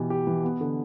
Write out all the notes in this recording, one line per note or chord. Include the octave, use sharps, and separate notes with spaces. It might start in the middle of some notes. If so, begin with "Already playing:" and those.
Already playing: B2 E3 G4
G4
E3
B3
D3